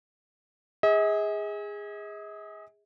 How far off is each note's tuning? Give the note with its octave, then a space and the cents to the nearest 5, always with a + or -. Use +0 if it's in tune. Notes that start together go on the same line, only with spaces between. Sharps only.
G#4 -15 D#5 +45